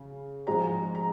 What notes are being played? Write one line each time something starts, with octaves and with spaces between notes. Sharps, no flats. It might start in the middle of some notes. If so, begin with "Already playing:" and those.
Already playing: C#3
G#2 F3 G#3 C4 A#5
A#5